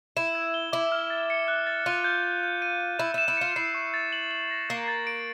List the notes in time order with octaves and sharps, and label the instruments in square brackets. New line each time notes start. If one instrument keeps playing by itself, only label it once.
[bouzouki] E4 [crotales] E7
[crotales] G#6
G7
[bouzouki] E4 [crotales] D6
[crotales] F6
A6
C#7
F#6
A6
[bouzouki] F4 [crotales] D#7
[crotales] G6
G6
G6
D#7
D#7
[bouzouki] E4 [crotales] E7
[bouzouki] E4 [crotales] E7
[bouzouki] E4
[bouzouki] F4 [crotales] C#7
[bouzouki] E4 [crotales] C7
[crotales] C#6
A6
F#7
F#7
A#6
[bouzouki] A#3 [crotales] A6
[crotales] A6
D7